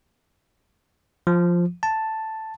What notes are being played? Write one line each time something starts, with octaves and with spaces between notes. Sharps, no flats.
F3
A5